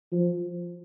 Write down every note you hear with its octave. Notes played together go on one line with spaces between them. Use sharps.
F3